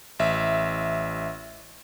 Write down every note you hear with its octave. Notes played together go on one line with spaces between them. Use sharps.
A1 E5